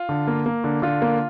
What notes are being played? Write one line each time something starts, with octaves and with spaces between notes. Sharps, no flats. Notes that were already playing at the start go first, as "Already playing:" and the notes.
Already playing: F4
D3
A#3
A#3
D3
D3 F4
A#3